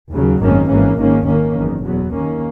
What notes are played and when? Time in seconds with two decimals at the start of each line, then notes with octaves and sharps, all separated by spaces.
0.10 D#2 C#3 F#3
0.40 G#1 F#2 D#3 A#3 C#4
0.68 G#1 G#2 E3 A#3 C#4
0.96 G#1 G#2 D#3 A#3 C#4
1.25 D#2 D#3 A#3 C#4
1.54 F#1 E2 D#3
1.82 E2 B2 F#3 B3
2.11 D#2 D#3 A#3 C#4